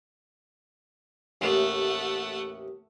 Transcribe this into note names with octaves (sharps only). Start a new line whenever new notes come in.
A1 D#2 A2 A3 F#5